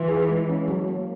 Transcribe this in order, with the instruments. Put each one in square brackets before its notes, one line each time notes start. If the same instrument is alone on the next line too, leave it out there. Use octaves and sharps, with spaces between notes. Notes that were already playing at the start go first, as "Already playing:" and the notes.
Already playing: [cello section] E3 [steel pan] F4
[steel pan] G#4
G#3
C#4
F#3
A#3